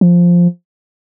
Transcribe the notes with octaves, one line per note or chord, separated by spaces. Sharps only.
F3